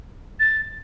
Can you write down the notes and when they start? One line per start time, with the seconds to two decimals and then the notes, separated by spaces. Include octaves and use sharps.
0.40 A6